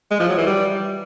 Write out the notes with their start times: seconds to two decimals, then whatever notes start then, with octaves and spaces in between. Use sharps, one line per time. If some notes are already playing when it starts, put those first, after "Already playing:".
0.11 G#3
0.20 F3
0.29 F#3
0.37 E3
0.46 G3